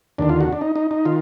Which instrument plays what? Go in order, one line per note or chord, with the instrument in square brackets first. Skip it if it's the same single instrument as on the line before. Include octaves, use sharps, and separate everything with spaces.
[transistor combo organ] D#2 D3 D4
F4
F#4
D4
D#4
D#4
D#4
D#3 F4